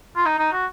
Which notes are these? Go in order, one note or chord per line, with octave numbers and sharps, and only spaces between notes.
F4
D#4
D#4
F#4